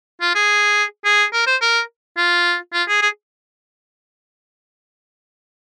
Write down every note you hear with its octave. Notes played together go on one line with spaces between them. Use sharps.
F4
G#4
G#4
A#4
C5
A#4
F4
F4
G#4
G#4